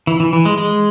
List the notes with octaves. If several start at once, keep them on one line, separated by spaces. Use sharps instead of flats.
E3
E3
E3
G#3
G#3